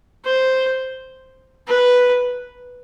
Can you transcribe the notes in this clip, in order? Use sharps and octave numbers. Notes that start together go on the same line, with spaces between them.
C5
B4